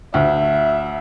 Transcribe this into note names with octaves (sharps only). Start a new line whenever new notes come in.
D2 E5